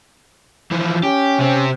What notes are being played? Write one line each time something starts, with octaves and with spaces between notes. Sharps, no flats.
E3 F3
C#4 G4
C3 C4